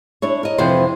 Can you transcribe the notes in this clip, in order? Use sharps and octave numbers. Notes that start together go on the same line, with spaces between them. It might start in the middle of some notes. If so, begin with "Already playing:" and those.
D4 E4 C#5
A#4 D#5
F2 C3 E3 E4 C5